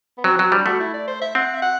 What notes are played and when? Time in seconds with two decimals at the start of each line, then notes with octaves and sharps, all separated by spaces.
0.18 B3
0.24 F#3 C4
0.39 F#3 C4
0.52 G3 D4
0.66 A3 F#4
0.80 E4
0.93 D5
1.07 C5
1.21 E5
1.35 C4 F#5
1.54 E5
1.62 F#5